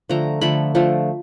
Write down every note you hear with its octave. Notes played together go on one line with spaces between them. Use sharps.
D3 F3 A3 A#5
D3 F3 A3 B5
D3 F3 A3